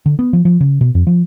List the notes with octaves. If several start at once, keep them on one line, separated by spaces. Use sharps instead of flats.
D3
B3
F3
F3
C#3
B2
F2
F3